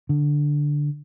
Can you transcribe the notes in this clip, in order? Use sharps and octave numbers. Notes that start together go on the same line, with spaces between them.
D3